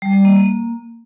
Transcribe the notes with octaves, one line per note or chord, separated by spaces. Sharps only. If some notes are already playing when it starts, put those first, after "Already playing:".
G3
G3
A#3
A#3